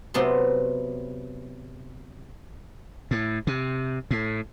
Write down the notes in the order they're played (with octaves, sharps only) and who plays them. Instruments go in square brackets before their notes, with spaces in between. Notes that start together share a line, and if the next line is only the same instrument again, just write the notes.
[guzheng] C3 F#3 B3 F#4 A5 C6
[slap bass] A2
C3
A2